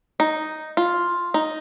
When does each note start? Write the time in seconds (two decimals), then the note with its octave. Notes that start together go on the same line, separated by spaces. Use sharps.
0.20 D#4
0.77 F4
1.34 D#4